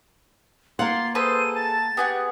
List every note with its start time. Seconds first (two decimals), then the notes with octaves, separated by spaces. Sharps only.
0.79 A#3 F4 F#5 C6
1.15 G#4 A4 B4 C5 D#7
1.55 A5 A6
1.97 B3 G4 G#4 F#5